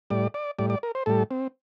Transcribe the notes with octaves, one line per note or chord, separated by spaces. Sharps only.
A2 G3 D5
D5
A2 G3 D5
D5
A#4
C5
A2 G3 A4
C4